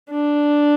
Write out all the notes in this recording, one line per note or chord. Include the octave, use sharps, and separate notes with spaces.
D4